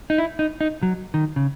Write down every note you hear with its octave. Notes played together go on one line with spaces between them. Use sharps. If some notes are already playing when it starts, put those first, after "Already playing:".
D#4
E4
D#4
D#4
F#3
D#3
C#3